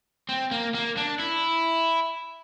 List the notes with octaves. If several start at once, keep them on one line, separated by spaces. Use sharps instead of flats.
C4
A#3
A#3
D4
E4